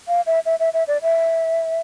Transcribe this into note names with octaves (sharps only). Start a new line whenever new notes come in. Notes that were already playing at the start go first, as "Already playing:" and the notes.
F5
E5
E5
E5
E5
D5
E5